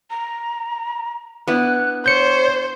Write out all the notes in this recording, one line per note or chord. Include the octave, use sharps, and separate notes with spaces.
A#5
B3 D4 E4 F#6
C5 C#5 G6 C#7